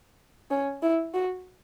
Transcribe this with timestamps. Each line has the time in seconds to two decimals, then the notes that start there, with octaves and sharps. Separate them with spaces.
0.51 C#4
0.83 E4
1.14 F#4